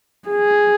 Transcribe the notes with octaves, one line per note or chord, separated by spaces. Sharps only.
G#4